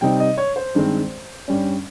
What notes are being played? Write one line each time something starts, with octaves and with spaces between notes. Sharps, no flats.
C3 G3 C4 D#4 G5
D#5
C#5
C5
G2 D#3 G#3 C4
G2 G3 C#4